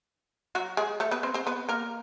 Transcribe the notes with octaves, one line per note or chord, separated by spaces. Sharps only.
F#3 F#4
G#3 G#4
A3 A4
B3 B4
C4 C5
C4 C5
B3 B4
A#3 A#4